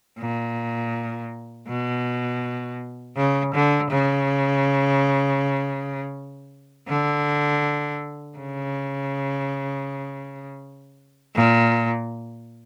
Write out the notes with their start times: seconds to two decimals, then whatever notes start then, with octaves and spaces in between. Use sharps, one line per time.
0.19 A#2
1.68 B2
3.16 C#3
3.54 D3
3.91 C#3
6.88 D3
8.38 C#3
11.36 A#2